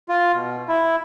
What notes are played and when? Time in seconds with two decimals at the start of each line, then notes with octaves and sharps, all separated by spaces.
0.08 F4
0.34 B2
0.68 E4